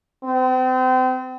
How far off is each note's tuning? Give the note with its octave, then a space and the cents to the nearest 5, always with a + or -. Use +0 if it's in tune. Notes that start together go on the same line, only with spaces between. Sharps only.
C4 -35